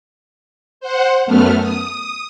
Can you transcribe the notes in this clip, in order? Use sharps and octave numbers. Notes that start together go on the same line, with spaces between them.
C5 F#5
F#2 A3 B3 F6
D#6